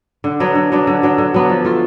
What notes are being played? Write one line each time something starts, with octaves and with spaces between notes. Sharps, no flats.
D3
F#3 B3 D4
D3
F#3 B3 D4
D3
F#3 B3 D4
D3
F#3 B3 D4
F3
A3 F4